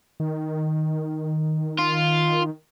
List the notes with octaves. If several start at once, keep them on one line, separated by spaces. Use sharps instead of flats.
D#3
F4